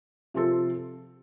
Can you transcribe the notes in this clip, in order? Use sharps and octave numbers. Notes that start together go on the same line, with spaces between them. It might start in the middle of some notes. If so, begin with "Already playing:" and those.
C3 F3 C4 F4 A4